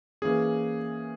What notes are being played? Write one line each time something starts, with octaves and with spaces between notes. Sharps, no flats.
E3 A#3 C#4 G#4